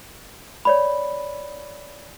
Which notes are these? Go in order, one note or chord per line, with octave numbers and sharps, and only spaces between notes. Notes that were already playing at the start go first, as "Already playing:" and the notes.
C#5 D5 B5